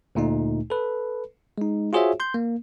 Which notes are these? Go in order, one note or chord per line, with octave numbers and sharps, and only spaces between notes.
D2 A#2 A3 D#4
A4 B4
G#3 D#4
F4 F#4 G#4 C5 C#5 E5
C6 G6
A#3